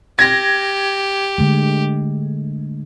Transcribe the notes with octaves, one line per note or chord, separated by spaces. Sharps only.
G4 G#6 A#6
D3 G#3 A3